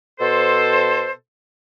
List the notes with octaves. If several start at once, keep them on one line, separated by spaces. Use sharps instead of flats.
B2 A4 C5